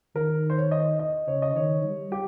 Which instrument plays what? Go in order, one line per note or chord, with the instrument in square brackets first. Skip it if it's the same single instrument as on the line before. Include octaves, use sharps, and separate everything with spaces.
[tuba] D#3 [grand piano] A#4
[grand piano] C5
C#5
D#5
D#5
[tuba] C#3 [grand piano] C#5
[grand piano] D#5
[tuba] D#3 [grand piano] C#5
[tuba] G3
[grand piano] G4